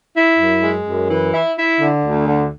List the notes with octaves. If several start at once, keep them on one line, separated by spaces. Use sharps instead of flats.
E4
F#2
G#3
F#2
E3
E4
E4
D3
D2
D3